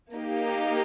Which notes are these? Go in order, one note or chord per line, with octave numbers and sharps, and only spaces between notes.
A#3 D#4 G4